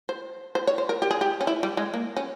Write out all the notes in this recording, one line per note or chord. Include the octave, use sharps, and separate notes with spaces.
C5
C5
C#5
C5
A#4
G4
G#4
G4
C#4
E4
G3
G#3
A#3
C#4